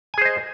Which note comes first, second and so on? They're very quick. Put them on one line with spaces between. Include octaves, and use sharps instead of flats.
G#5 G#4 C5 D#5